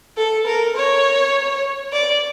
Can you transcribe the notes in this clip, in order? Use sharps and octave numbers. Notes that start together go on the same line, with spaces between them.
A4
A#4
C#5
D5